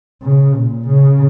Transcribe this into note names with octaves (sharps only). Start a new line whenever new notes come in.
C#3
A#2
C#3